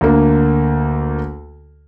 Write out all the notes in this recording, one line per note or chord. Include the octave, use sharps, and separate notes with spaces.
D2 D3 A#3